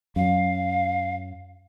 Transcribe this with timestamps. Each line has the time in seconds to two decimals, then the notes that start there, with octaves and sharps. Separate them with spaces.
0.16 F#2 F#3 F5